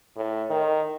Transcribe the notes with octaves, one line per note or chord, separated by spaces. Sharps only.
A2
D#3